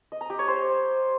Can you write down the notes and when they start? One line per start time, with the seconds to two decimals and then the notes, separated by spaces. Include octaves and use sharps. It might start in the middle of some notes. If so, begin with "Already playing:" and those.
0.12 D#5
0.21 A#5
0.30 G4
0.39 C#5
0.48 C5